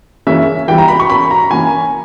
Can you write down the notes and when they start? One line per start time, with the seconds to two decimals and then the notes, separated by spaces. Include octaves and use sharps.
0.27 C#3 E3 A#3 C#4 E5
0.68 E3 G3 B3 G5
0.78 A#5
0.88 B5
1.00 C#6
1.10 A#2 A#3 C#4 B5
1.31 A#5
1.51 E3 A#3 C#4 G#5